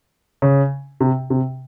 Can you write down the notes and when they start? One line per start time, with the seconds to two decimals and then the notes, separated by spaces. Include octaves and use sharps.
0.42 C#3
1.00 C3
1.30 C3